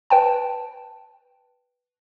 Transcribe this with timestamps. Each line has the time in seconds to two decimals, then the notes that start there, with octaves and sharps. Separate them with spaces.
0.10 B4 G5 A5